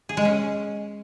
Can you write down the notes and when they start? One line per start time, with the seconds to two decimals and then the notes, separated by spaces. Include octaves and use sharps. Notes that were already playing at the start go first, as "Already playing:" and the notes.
0.09 G#4
0.17 G#3
0.25 C#4